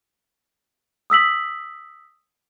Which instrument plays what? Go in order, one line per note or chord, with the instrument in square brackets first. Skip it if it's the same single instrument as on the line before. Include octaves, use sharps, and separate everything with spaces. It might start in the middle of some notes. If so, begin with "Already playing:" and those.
[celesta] D#6 E6 B6 F#7